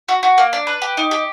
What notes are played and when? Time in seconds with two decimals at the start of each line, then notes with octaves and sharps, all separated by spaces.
0.08 F#4
0.23 F#4
0.38 A#3
0.53 D4
0.67 B4
0.82 G4
0.97 D#4
1.11 G4